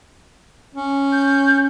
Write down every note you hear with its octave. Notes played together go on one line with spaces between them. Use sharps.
C#4
G6